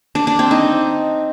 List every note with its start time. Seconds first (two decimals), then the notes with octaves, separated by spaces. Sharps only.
0.15 D4
0.27 D4
0.39 C4
0.51 D#4